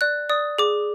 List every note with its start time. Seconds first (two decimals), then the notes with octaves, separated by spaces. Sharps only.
0.01 D5 F#6
0.29 D5 D#6
0.59 G#4 D6